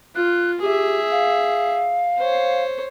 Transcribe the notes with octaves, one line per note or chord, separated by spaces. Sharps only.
F4 F#6
G4 G#4 E5
F5
C5 C#5